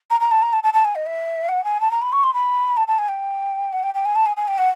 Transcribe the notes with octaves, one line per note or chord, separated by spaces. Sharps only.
A#5
A#5
A5
A#5
A5
A5
A5
G#5
D#5
E5
F#5
G#5
A5
A#5
B5
C#6
C6
B5
A5
A5
G#5
G5
F#5
G5
G5
G#5
A5
G#5
G#5
G5
F#5